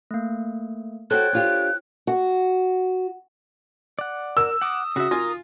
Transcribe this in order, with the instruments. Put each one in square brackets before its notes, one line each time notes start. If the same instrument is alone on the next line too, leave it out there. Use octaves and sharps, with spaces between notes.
[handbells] A3 A#3
[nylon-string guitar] F#4 A4 [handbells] C5 C#5 G5 [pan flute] F#6
[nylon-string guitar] D4 F4 G4
[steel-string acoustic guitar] F#4
[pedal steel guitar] D5 F#5
[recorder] A#4 [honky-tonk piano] E6
[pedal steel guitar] F#5 D6 [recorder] D#6
[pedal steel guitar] C#3 E5 [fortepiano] F#4
[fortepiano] F4 F5 G#5 [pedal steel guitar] A#4 A#5